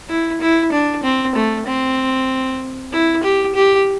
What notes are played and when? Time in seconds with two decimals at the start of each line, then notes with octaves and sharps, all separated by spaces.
0.09 E4
0.41 E4
0.72 D4
1.03 C4
1.35 A3
1.67 C4
2.92 E4
3.23 G4
3.55 G4